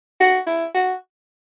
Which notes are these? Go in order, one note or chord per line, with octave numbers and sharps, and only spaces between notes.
F#4
E4
F#4